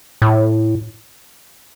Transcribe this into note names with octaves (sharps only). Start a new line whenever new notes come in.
A2